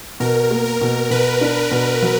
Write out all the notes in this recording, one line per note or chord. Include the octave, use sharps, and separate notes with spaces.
B2 A#4
A#3
A#4
B2
B2 B4
D4
B2
F#3